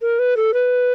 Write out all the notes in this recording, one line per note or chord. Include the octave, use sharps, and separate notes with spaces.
A#4
B4
A4
B4